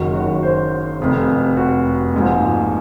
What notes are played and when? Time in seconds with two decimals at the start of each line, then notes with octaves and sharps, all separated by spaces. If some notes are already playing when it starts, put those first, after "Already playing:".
Already playing: F#1 F#2 D#3 F#3 F#4
0.14 F#4
0.43 C5
0.99 F1 F2 C3
1.57 F#4
2.13 A#1 G#2 F3